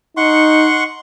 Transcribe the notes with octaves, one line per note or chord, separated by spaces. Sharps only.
D#4 F#5 C6 C#6